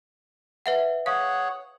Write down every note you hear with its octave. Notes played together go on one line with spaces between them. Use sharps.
B4 E5 F#5
G#4 C#5 F5 F#5